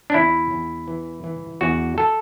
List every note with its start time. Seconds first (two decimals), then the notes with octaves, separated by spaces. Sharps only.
0.10 D4
0.14 E2 E4
0.51 E2
0.88 E3
1.24 E3
1.61 E2 F#4
1.98 A4